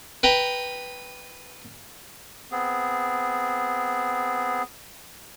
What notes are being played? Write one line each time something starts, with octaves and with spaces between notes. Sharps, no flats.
B4 G5 A#5
B3 C4 G#4